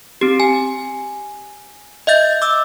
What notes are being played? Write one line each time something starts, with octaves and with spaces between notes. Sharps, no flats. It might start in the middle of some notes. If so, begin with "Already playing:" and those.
C4 G4
G#5
D#5 E5 G6 A6
D6 E6